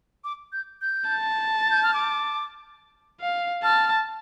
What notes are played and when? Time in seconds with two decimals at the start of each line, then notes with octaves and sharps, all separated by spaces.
0.24 D6
0.52 G6
0.81 G6
1.10 A5
1.60 A6
1.71 G6
1.83 F6
1.94 D6
3.21 F5
3.63 A5 F6